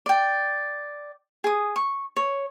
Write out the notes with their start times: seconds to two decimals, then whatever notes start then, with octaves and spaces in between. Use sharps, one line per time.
0.06 D5 G5
1.44 G#4 D#6
1.76 C#6
2.16 C#5